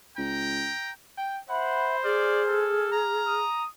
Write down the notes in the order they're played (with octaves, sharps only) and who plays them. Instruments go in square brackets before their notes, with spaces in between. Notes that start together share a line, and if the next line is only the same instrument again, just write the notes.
[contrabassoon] C#2 [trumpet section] G5 A#5
[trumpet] G5
[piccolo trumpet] C5 [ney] E5 [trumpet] F#5 [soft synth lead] B5
[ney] G#4 [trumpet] D5 [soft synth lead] F6
[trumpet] A4
A#5
[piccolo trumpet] D#6